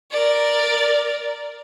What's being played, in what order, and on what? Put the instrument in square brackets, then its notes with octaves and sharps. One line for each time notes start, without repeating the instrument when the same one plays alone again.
[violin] A#4 D5